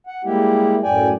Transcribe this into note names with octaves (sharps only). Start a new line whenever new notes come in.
F#5
G3 G#3 A#3 E4 G4
F#2 A2 D5 G5 G#5